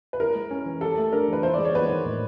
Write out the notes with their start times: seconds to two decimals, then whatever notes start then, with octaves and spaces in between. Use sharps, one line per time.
0.13 B4
0.20 E4 A#4
0.35 G#3
0.51 C#4
0.66 E3
0.81 G4 A4
0.98 A3
1.13 D4 A#4
1.28 E3 B4
1.43 E4 C5
1.54 G#3 D5
1.65 C#5
1.74 B3 B4
1.90 D#3
2.06 A2